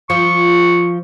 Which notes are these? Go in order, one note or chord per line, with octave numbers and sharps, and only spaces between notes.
F3 C#6